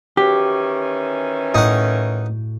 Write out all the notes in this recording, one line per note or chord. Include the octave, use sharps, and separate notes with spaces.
D#3 E3 C#4 F#4 G4
A2 D#4 F#5